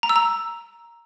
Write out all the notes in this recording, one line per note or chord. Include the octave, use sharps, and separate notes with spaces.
A#5
E6
A#5